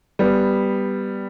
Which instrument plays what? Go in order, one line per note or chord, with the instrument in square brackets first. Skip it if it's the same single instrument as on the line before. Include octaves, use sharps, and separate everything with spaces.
[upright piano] G3 B3